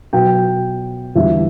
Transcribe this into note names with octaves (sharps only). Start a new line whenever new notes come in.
B2 F#3 B3 G5
E2 D3 G3 E5